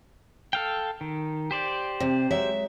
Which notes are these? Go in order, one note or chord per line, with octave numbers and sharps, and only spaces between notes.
A4 F5 G5
D#3
G4 C5 D5
C3
F#3 G#3 E5